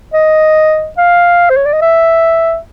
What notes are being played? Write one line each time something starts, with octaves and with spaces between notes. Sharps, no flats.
D#5
F5
C5
C#5
D5
D#5
E5